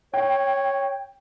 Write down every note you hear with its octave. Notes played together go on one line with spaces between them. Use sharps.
C#5 G5